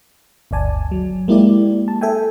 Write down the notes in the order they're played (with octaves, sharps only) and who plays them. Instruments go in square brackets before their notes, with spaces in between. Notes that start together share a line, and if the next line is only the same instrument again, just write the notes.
[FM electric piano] G1 D2 D5 G#5 A5
F#3
G#3 A#3 E4 G4 D5
A5
A4 E5 G5 G#5